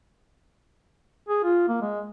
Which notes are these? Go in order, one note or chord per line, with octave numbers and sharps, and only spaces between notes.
G#4
F4
A#3
G#3